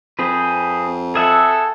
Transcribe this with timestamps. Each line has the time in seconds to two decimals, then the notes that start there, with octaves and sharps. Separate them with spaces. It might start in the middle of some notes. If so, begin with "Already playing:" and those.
0.19 F2 C4 G#4 B4
1.15 G#4 A4 E5 F#5